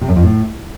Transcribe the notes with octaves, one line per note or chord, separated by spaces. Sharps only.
C3
F#2
F2
A2